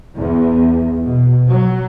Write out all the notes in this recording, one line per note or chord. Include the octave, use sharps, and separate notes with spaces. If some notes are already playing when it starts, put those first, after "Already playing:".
E2
B2
F#3